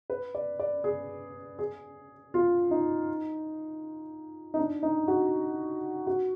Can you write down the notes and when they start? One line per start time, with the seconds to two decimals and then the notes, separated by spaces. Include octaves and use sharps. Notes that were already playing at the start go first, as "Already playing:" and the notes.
0.10 B4
0.35 D5
0.59 D5
0.84 G#4
1.59 G#4
2.34 F4
2.71 D#4
4.54 D#4
4.58 D4
4.83 D#4
5.08 F#4
6.07 F#4